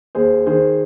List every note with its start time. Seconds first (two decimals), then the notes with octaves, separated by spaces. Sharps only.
0.15 D#2 G#4 C5
0.46 D#3 G#4 C5